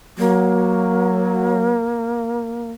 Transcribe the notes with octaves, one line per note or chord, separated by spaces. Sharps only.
F#3 A#3